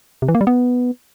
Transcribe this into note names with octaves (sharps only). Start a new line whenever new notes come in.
C3
E3
A#3
G3
B3